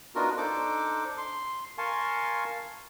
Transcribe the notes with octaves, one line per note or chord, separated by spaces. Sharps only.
B3 D4 D#4 F4 F#4 A#4
D4 D#4 A4 C5 D6
C6
A#4 F5 G#5 A5 C6 C#6